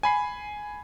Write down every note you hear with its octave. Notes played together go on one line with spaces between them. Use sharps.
G#5 B5 C7